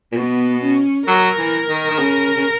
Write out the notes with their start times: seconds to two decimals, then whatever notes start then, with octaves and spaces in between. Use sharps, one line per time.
0.12 A#2
0.16 B2 B3
0.62 C#4
1.07 F#3 A#4
1.38 E3
1.69 D#3
1.91 D#3
1.99 C#3
2.37 C#3